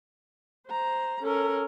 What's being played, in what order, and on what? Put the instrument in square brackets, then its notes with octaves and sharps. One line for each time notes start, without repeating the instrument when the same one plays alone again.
[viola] C5 A#5
[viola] C#4 A#4 [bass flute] A4